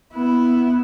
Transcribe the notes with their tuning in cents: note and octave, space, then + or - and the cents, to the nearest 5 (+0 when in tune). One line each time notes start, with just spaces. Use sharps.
B3 +0 E4 +0